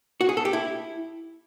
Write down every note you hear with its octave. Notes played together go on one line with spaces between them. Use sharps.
F#4
G#4
A4
G4
E4